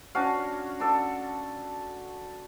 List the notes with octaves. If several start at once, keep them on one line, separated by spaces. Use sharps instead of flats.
C#4 D4 F#4 F5
D4 A4